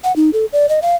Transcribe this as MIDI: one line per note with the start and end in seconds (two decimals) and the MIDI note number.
0.04 0.15 78
0.16 0.30 63
0.33 0.45 69
0.53 0.69 74
0.69 0.80 75
0.82 0.96 77